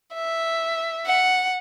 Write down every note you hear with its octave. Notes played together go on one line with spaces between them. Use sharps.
E5
F#5